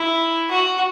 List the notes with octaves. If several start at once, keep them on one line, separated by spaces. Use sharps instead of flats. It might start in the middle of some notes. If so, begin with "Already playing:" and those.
Already playing: E4
F#4